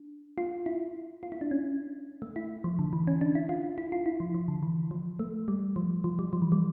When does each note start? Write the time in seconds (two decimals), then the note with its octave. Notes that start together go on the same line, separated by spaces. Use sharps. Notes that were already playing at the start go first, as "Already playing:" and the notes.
Already playing: D4
0.38 F4
0.66 E4
1.23 F4
1.32 E4
1.41 D4
1.51 C#4
2.22 A3
2.36 E4
2.64 F3
2.79 D3
2.93 E3
3.07 C#4
3.21 D4
3.35 E4
3.49 F4
3.78 E4
3.92 F4
4.06 E4
4.20 F3
4.35 F3
4.48 D3
4.63 E3
4.91 F3
5.19 A3
5.48 G3
5.76 F3
6.04 F3
6.19 G3
6.33 F3
6.42 E3
6.52 G3